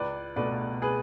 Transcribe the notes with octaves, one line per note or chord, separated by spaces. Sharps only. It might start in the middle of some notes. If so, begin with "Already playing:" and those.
Already playing: C#2 B4 D5
B2 A3 B4 D5
G#4 B4